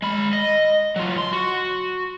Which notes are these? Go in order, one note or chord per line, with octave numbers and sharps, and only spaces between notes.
G#3 B5
D#5
F#3 F4
C6
F#4